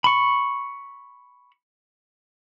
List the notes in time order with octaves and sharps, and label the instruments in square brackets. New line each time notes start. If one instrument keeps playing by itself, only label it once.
[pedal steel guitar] B5 C#6